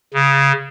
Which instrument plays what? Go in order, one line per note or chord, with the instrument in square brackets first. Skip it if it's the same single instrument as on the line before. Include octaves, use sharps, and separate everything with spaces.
[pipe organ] C#3